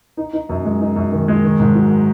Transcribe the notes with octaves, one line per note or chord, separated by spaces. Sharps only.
D#4
D#4
F#2
G#3
D#4
F#2
D#3
G#3
D#3
G#2
F#3